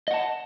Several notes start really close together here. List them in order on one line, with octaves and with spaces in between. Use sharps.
D#5 F#5 A5